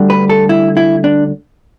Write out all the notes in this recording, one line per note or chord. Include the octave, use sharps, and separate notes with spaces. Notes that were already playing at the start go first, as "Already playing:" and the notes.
Already playing: D2 D3 G3 D4
B4
A4
E4
E4
D4